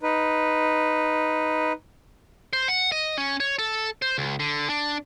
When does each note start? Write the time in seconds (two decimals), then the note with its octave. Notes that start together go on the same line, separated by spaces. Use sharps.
0.03 D#4 B4
2.53 C5
2.68 F#5
2.92 D#5
3.18 C#4
3.40 C#5
3.59 A4
4.02 C5
4.18 C#2
4.40 D3
4.69 D4